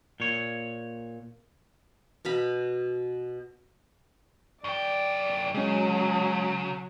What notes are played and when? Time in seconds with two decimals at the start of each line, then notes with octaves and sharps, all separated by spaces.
0.20 A#2 C#5
2.25 B2 F5 B5
4.64 F#2 D5 G5
5.55 C#3 F#3 G#3 C#4